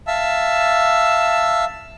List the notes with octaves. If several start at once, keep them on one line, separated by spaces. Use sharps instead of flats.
E5 F5 A5 E6